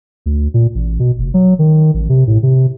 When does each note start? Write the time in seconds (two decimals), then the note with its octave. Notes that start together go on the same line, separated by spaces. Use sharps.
0.26 D2
0.54 A#2
0.75 A1
0.99 B2
1.19 F1
1.34 F#3
1.59 D#3
1.94 A1
2.09 C3
2.27 A2
2.43 C3